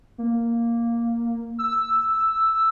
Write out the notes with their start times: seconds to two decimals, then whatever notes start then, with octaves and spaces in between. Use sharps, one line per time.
0.18 A#3
1.59 E6